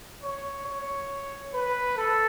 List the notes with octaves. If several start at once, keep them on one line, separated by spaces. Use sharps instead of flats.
C#5
C#5
B4
A4